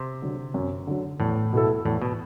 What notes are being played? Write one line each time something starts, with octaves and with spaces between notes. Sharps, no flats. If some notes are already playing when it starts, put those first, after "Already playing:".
Already playing: C3
D3 F#3
F#2
D3 F#3
E2 A2
B2 A3 E4 A4
E2 A2
B2